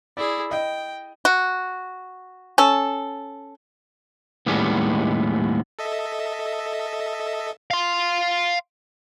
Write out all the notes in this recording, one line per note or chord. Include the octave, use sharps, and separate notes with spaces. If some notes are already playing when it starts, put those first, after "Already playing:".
E4 G#4 D5
D#5 G5
F#4
C#4 A4
D#2 A2 G3 G#3 B3 C#4
A4 D#5 E5
F5 C6